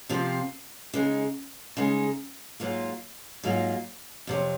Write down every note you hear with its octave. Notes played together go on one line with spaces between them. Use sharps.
C3 F3 C4 F4
C#3 G#3 D#4
C#3 G#3 D#4
G#2 F#3 A#3 F4
G#2 F#3 A#3 F4
F2 C3 F#3